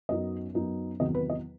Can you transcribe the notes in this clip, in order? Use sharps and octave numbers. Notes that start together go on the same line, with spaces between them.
F#2 F#3 B3 D#4 D#5
F#2 F#3 B3 D#4
E2 C3 D#3 F#3 B3 D#5
B4
D#5